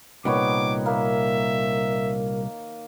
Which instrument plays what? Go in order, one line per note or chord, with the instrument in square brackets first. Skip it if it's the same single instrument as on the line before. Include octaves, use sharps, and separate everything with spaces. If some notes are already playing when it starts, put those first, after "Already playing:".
[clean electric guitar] C2 A#2 [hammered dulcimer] D#3 B3 C#5 [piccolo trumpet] D6
[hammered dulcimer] A#3 [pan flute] A#4 [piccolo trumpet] E5